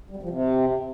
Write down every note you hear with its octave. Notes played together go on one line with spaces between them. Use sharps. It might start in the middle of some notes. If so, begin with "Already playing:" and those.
G3
C3
F3
C3